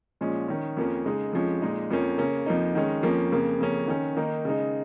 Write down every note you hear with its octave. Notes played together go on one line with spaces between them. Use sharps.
A#2 F3 G#3 C#4
D#3 C#4
F2 F3 A#3 C#4
C#3 G#3 D#4
F2 F3 G#3 C#4
A#2 G#3 D#4
F2 F3 A#3 C#4
C#3 A#3 C#4
F2 F3 A#3 D#4
D#3 G#3 C#4
F2 F3 A#3 C#4
F2 C#3 A#3
F2 C#3 A#3 C#4
D#3 C#4
D#3 A#3 D#4
C#3 G#3 D#4